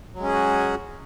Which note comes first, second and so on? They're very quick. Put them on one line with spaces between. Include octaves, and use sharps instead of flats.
F#3 G#3 C#4 G#4 F#4